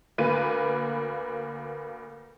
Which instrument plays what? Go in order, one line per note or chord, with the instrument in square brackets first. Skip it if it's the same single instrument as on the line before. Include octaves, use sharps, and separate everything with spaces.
[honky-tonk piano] D2 A#3 B4 B5 D#7